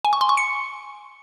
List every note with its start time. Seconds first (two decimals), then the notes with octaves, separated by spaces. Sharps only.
0.05 G#5
0.13 C#6
0.21 C6
0.29 C#6
0.37 C#7